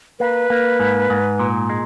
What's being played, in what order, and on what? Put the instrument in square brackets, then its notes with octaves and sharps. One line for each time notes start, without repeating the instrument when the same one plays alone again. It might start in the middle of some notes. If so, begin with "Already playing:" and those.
[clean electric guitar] A#3 [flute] B4
[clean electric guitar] A#3
G#2
G#2
A#2
G#3